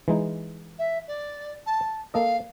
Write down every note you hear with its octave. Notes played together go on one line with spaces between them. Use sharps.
E3 G#3 D#4
E5
D5
A5
A#3 A4 D#5 F5